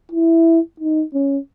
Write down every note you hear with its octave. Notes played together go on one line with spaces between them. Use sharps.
E4
D#4
C#4